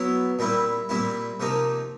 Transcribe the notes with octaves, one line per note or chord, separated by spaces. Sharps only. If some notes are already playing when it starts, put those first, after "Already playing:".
Already playing: F#3 B3 E4
A#2 G3 C4 E4
A#2 G3 C4 E4
C3 F3 A#3 D#4